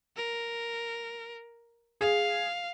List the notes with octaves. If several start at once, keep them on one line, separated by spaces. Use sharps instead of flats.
A#4
G#4 F5